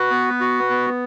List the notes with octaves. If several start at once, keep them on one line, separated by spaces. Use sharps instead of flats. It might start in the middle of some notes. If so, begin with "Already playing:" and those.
Already playing: F#4 B4
B3
F#4
B3